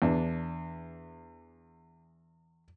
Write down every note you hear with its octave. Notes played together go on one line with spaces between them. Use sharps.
E2 D4